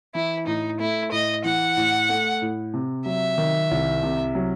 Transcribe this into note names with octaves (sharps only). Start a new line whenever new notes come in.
E3 E4
A2 D#4
A3 E4
A2 D#5
E3 F#5
A2
A3
A2
C3
F#3 E5
D#3
C2
C3
F#3